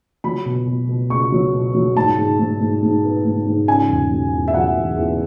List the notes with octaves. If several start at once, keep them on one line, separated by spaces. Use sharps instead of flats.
F#3 B5
B2
B2
B2
C#2 C#6
F#3
B2
F#3
G#2 A5
G#2
G#2
G#2
G#2
B3
G#2
G#2
C#3 G#5
E1
F#3
E2
E5
F#3 F#5
E2
E2